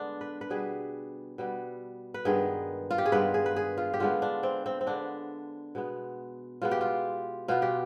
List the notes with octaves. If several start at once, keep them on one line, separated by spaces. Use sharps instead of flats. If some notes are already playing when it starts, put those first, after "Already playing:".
Already playing: D3 G#3 B3 D4
B4
B4
B2 G3 B3 G#4
B2 G3 B3
B4
G2 D#3 G#3 B3 G#4
F4
G4
G#4
G2 D#3 G#3 B3 B4
G#4
B4
G#4
F4
G4
D3 G#3 B3 F4
D4
C4
C4
C4
D3 G#3 B3 D4
B2 G#3 B3
B2 G#3 B3 F4
G4
F4
B2 B3 F4
G4